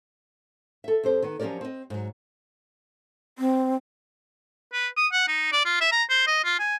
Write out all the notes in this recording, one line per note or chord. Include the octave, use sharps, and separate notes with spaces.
A4 E5
F2 C4 G4 C5
D#3 B3
F3 F#3 C#4 G4 A#4 D5
C4 D#5
G#2 F#3
C4
B4
D#6
F#5
D#4
D5
F4
E5
A#5
C5
D#5
F4
G#5